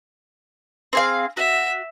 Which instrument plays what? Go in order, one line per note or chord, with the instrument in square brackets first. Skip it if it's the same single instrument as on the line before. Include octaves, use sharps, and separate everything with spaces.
[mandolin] C4 G#4 F5
[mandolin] F#4 [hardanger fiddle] E5